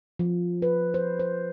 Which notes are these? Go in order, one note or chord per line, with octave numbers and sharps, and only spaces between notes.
F3
B4
C5
C5